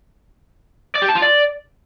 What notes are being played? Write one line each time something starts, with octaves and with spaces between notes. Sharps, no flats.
D5
G4
A5
F4
D5